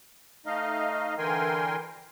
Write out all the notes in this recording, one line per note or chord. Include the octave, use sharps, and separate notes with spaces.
A3 D#4 D#5 F5
D3 E3 A#4 G5 G#5 C6